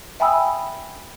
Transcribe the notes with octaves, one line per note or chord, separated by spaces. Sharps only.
E5 G5 G#5 B5 D#6 E6